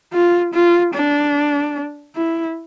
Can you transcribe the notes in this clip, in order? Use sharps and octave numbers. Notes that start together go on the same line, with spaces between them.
F4
F4
D4
E4